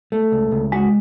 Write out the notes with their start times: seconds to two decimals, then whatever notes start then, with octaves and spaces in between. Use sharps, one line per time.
0.12 A3
0.32 C#2
0.51 C#2
0.72 G#3 F#4